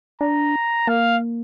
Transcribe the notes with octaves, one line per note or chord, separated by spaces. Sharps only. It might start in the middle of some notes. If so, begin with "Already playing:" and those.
D4 A#5
A#3 F5